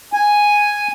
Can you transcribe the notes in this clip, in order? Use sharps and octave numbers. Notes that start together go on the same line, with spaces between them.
G#5